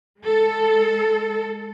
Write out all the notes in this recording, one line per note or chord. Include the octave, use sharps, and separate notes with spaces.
G#3 A4